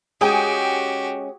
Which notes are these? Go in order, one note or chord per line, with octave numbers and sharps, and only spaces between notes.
G#3 C#4 F#4 G4 G5 G#5 D#6